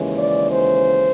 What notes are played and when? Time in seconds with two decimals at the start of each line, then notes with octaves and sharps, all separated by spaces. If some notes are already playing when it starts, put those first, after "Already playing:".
Already playing: D#2 C#3 E3 G#3 C#4
0.18 D5
0.52 C5